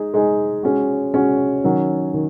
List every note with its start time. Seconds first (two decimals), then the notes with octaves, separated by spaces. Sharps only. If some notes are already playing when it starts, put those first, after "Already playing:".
Already playing: G#3 D#4 G#4
0.14 G#3 D#4 G#4
0.63 G#3 C#4 F#4
1.14 G#3 C#4 F#4
1.64 D#3 F#3 C#4
2.14 D#3